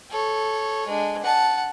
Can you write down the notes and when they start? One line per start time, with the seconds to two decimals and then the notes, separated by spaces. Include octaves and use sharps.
0.10 A4 C#5
0.87 G#3 D4
1.22 F#5 A5